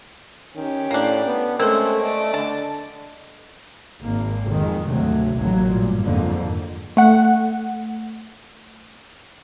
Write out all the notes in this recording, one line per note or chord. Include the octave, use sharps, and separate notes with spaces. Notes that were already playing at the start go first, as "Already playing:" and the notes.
D#3 C#4 G4
A2 A#3 D4
B3
G#3 A3 C4 C#4 A4 A#4
D5 D#5
D3 A5
G#1 A#3
F2 D#3 G#3
D2 G#2 C3 F#3 A3
A1 D#2 A#2 F#3 A#3
G2 A#2
F2 G#2 D3 A#3
A3 F#5